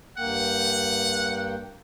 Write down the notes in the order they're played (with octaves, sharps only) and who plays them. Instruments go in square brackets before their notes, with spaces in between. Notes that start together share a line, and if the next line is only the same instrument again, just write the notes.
[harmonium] G2 A#3 G5 [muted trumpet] F#5